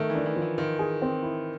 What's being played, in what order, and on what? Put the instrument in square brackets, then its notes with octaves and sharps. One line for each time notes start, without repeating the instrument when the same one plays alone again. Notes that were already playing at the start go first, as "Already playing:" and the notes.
Already playing: [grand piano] D#3 [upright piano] A3
[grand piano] E3
[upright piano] D4
[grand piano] E3
[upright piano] F3
[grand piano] E3
[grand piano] D#3 [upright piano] F4
[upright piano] G#4
C4
E4